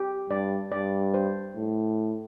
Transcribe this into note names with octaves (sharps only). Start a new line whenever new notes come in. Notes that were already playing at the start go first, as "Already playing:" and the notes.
Already playing: G4
G2 D5
G2 D5
C5
A2